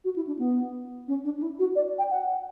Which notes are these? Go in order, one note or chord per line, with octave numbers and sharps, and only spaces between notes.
F#4
E4
D4
B3
C#4
D4
D4
E4
F#4
D5
G5
F#5